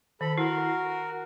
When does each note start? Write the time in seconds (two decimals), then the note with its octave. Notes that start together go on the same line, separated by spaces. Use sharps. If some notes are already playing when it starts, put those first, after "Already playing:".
0.21 D#3 A4 B5
0.38 E4 F#4 A#4